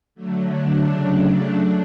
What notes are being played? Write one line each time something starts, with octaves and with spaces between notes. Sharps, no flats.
D3 F#3 A3
D4
C#3 F#3 A3
D4
F#3 A3 D4